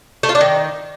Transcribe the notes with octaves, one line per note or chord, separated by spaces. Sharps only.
A3
F4
D4
D#3